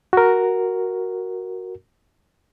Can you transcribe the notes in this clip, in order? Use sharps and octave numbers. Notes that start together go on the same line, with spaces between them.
F#4 A#4